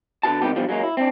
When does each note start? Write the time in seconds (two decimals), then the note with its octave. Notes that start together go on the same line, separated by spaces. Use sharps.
0.23 D3 B3 F#4 A5
0.42 C#2 C3 D#3 B3 G4
0.56 E2 B2 D3 F3 G3
0.69 F#3 G#3 A#3 C#4
0.83 E4
0.97 C4 D4